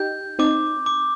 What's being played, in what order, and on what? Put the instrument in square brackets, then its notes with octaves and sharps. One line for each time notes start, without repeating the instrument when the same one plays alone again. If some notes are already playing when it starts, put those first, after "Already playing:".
Already playing: [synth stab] D#4 G4 [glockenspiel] G6
[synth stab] C4 D#4 [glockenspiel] D6
[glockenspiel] D6